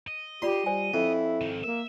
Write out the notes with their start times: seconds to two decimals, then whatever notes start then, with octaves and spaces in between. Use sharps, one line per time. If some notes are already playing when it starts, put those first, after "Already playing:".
0.07 D#5
0.42 F4 G4 D5 B5 C6
0.66 G3 C5 D5 G#5
0.94 F2 E4
1.41 G#2 D#3
1.64 A#3 A#4 E5